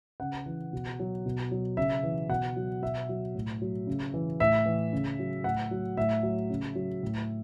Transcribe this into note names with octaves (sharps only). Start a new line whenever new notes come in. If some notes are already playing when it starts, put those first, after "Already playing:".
C#3 F#5
E3
B2
F#3
B2
F#3
C#3 E5
E3
B2 F#5
F#3
B2 E5
F#3
A2
F#3
C#3
E3
A2 E5
E3
C#3
F#3
A2 F#5
F#3
A2 E5
F#3
C#3
F#3
A2